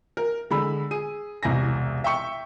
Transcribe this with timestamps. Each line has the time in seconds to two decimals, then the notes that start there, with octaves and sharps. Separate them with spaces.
0.17 A#4
0.50 D3 G#3 B5 E6
0.91 G#4 D#7
1.43 E1 C2 G#5 A#6
2.04 E5 G5 C#6 C#7